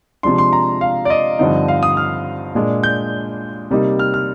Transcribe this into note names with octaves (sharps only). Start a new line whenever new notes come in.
C3 F3 G#3 D4 C6
C6
A#5
F5
D5
D#5
G2 D3 F3 C4 D#4
F5
D#6
F6
A#2 G#3 D4
G6
C3 G3 A#3 D#4
F6
F6